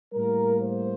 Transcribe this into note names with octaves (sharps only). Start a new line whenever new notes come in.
A2 G3 A#3 A#4
C5